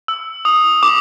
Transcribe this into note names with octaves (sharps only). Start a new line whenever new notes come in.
E6
D#6
D6